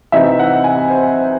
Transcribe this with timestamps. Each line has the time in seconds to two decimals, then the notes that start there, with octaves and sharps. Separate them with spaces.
0.12 C3 E3 C4 D#4 E5
0.39 F#5
0.64 G#5
0.90 C5